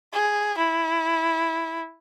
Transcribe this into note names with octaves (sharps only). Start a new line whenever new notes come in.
G#4
E4